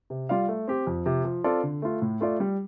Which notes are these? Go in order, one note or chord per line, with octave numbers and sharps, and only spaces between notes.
C3
G3 F4 D5 F5
A3
C4 G4
F2
C3 F3
F3
C4 F4 A4 D5
D3
A3 F4
A2
A3 F4 D5
G3